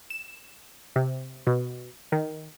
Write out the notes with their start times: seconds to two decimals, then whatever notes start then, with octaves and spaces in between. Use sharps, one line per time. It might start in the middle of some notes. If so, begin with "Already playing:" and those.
0.10 E7
0.96 C3
1.47 B2
2.12 D#3